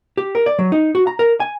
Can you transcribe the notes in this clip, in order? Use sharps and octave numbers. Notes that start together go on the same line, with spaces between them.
G4
A#4
D5
F#3
D#4
F#4
A#5
A#4
G#5